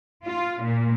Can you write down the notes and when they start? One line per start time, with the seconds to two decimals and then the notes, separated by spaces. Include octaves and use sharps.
0.25 F4
0.62 A#2